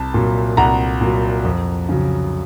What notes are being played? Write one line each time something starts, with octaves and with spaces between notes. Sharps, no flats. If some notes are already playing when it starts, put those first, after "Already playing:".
Already playing: C2 A5
A#2 F#3
C2 F#5 A#5
A#2 F#3
F2
C#3 F#3